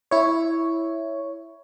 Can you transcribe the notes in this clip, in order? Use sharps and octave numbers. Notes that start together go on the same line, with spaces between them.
E4 C#5